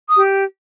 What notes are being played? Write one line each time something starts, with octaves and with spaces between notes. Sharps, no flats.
D#6
G4